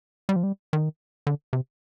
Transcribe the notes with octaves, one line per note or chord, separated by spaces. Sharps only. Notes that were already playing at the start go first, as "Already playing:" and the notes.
G3
F3
G3
D#3
D3
C3